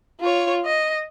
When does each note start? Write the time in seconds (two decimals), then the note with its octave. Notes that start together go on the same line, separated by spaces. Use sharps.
0.20 F4 C#5
0.65 D#5